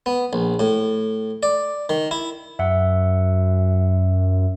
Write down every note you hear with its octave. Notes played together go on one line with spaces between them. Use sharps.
B3
A#1
A2
D5
D#3
E4
F#2 E5 F#5